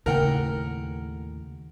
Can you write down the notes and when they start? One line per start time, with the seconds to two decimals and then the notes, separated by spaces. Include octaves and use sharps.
0.06 D#2 A2 C#3 C4 A#4 F#5 G5